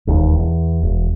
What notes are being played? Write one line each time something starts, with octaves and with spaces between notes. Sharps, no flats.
E1 D#2
E2
E1